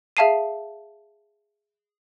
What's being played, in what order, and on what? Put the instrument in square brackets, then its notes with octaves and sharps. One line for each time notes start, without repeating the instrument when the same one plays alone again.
[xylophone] G#4 E5 F5 A5 C7 D#7